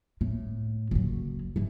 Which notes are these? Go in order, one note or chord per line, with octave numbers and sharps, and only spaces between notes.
A2
F#1 F#3
G#2 E3